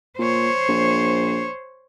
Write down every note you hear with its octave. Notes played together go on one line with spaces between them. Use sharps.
A#2 C5 C#5
A#1